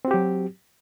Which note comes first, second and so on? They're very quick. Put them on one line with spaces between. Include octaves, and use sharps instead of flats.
C4 F#4 G4 F#3